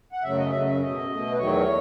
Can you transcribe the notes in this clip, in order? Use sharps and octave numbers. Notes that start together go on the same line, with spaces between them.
F#5
F#2 C#3 F#3 A3 E5
D#5
F#2 C#3 F#3 A3 E5
E5
B2 A3 D#5
B2 A3
B4
E2 D#3 F#3 A3 C#5